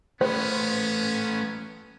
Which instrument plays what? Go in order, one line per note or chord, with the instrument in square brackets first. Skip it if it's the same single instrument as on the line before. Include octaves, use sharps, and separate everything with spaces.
[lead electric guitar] A3 B4 [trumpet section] B3 C#4 [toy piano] C5